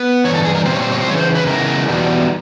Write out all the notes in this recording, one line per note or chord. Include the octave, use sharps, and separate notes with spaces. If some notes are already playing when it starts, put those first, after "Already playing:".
Already playing: B3
G2 E3 C#5
A4
G#4
A#4
A#2 G3 C4 C5
C#5
C5
C#5
C5
E2 C#3 E3 C#5
C5
B4
C#3 E3 G#3 B3 A#4
E2 B2 G3 B3 D#4